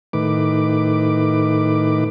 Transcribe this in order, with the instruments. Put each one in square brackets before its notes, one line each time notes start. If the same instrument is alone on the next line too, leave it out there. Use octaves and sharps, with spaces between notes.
[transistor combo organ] A2 D#3 B4 D6